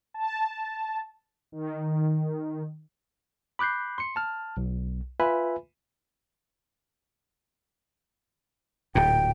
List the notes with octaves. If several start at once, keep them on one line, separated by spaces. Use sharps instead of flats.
A5
D#3
B5 D6 F#6 G6 C7
C6 C#7
A5 F6
B1
F4 B4 E5 G#5 B5
D1 A#2 G5